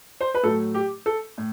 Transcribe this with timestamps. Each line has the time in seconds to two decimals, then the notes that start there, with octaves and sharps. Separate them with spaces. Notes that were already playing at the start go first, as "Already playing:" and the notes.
0.21 C5
0.34 B4
0.43 A2 F#3 A3 A4
0.74 G4
1.06 A4
1.38 A2